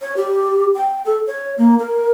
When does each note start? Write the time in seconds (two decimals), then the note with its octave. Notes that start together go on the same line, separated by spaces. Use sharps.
0.01 C#5
0.16 G4
0.75 G5
1.05 A4
1.27 C#5
1.58 A#3
1.79 A#4